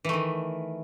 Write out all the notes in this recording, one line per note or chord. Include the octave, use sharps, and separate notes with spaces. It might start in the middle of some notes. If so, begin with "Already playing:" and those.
D#3 E3 A3